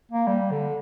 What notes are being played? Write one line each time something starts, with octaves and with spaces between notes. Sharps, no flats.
A#3
G3
D3